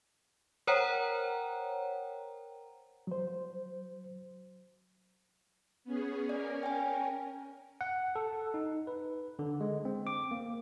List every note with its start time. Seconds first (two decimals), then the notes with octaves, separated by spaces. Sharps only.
0.67 A#4 C5 C#5 F#5 G5 A#5
3.07 F#3 C5
5.84 B3 C#4 G#4
6.29 C#4 A#4 D5
6.63 G5 G#5
7.81 F#5
8.16 A4
8.54 D#4
8.87 B4
9.39 D3
9.61 G#3
9.85 C4
10.07 D6
10.31 A#3